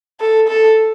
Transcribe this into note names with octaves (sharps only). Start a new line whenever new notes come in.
A4
A4